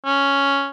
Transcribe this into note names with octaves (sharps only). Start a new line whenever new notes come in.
C#4